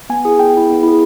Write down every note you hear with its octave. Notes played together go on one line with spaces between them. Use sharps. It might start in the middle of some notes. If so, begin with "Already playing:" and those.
B3 G#5
E4 G#4
B3 G5
E4 G#4
B3
E4 G#4